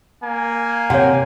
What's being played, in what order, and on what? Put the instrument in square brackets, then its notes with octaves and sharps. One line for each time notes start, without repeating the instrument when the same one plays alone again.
[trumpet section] A#3 G#5
[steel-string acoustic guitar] C3 [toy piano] C#5 F#5